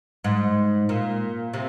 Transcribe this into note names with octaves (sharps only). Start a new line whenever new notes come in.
G#2
A#2
C3